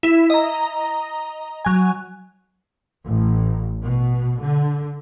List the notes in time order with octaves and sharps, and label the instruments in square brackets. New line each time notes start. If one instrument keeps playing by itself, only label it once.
[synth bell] E4
D#5 A#5
F#3 G#5
[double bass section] A1
B2
D3